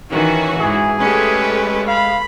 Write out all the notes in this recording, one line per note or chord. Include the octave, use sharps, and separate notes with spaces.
D#3 E3 C#4 F#4
G#2 E3 G#4
G#3 A3 C#4 G4 B4
F5 B5